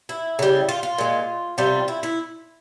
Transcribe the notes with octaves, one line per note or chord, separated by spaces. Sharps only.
E4
C#3 G3
F4
F4
A#2 G#3
C3 G3 F4
E4
E4